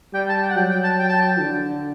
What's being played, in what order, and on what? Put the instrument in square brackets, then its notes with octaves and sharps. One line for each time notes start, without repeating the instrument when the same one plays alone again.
[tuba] G3 [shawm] G5
[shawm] A5
G5
F#5
[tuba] F#3 [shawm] G5
[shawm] G5
A5
G5
A5
G5
[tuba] D3